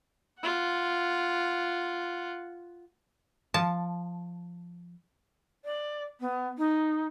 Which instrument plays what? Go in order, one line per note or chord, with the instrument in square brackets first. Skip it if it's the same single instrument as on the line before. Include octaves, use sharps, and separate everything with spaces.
[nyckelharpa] F4 F#5
[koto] F3 A5
[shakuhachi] D5
B3
D#4